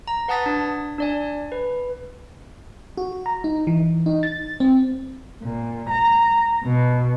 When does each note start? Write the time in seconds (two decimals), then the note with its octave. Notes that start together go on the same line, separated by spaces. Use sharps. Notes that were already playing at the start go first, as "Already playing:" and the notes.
0.08 A#5
0.28 B4 F#5 A5 D#6 A6 B6
0.46 D4
0.98 D4 D5 G#5
1.52 B4
2.97 F#4
3.26 A#5
3.44 D#4
3.67 E3
4.06 D#4
4.23 A6
4.60 C4
5.42 A#2
5.90 A#5
6.63 B2